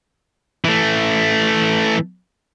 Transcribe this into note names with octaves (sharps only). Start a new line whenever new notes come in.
E3 A3